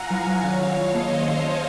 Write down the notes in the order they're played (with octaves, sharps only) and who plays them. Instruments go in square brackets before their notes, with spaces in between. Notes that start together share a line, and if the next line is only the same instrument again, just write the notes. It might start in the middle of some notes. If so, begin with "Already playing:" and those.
Already playing: [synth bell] F4 [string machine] F5 F#5 G#5 A#5
[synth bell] F#3
F#3
[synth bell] D#3 [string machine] C#5 F5
[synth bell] F4
F#3
[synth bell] A#3 [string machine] C5 D#5
[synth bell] D#3
F4
A#3